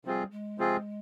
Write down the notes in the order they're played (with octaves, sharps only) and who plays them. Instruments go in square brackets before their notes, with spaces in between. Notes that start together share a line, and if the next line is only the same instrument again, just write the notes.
[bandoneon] C3 F3 C4 F4 G#4 [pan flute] G3
[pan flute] G#3
[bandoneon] C3 F3 C4 F4 G#4